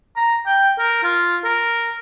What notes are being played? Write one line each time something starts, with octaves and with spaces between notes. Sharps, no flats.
A#5
G5
A#4
F4
A#4